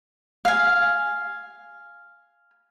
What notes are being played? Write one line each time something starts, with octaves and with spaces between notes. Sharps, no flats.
F5 G#5